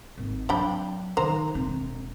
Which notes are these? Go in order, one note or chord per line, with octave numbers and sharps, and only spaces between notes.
G#1
F#3 C4 D4 G5 B5
D#3 C5 A#5
E1 C4